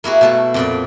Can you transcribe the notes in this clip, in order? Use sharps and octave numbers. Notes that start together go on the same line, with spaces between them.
A#3 E4 F#4 G#4
B2 A3 A4
F2 A#2 D5